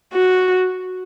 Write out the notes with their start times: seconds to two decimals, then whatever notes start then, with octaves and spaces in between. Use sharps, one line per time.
0.14 F#4